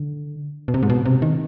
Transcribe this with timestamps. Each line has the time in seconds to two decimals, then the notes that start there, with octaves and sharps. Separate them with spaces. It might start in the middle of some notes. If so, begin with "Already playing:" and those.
Already playing: D3
0.68 B2
0.74 C3
0.83 G#2
0.90 B2
1.06 C3
1.22 D#3